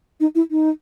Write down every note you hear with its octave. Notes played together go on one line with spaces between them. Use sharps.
D#4
E4
D#4